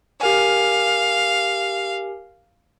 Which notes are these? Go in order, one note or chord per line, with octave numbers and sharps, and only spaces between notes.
G4 A#4 F5 G#5